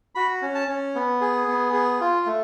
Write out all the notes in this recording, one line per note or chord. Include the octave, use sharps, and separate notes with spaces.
F#4 B5
C#4
A5
C#4
B3
G#4
B3
G#4
F4
A3